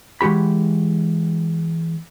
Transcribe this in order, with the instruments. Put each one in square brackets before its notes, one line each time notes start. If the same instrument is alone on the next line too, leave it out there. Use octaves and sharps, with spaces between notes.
[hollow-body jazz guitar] E3 G#3 F#4 G4 B5